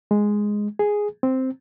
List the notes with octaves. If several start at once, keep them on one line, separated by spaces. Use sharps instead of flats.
G#3
G#4
C4